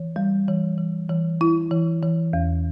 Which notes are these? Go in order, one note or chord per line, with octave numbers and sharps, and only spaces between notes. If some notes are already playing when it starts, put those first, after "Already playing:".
Already playing: E3
G3
E3
E3
E3
E4
E3
E3
E2